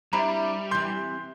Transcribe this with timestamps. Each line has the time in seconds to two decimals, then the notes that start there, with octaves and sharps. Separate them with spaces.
0.13 G3 C4 D4 E4 A#5 B5
0.71 C3 E3 C6 G6